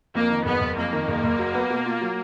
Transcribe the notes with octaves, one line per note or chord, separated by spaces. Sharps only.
F2 A#3
D#3
F#1 B3
F#1
F2 A#3
D#3
F#1
F#1
F#3
B3
B2
F4
F#3